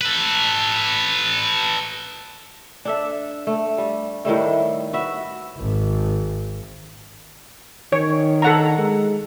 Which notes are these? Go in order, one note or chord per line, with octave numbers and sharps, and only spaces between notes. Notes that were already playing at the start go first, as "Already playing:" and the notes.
A4 B4
D4 A4 E5
A3
G3
A2 D#3 G3 A3
F#4 B4 E5
G#1
D#3 C#5
A4 F#5 A#5
G#3